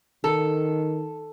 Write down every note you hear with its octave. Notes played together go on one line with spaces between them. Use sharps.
D#3 A4